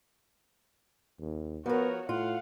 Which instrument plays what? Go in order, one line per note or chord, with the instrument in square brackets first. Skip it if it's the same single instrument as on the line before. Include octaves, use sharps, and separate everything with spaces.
[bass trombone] D#2
[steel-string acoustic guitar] F3 A#4 [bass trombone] B3 [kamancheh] F#4 C#5
[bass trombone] A2 [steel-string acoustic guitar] F4 [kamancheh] F5 F#5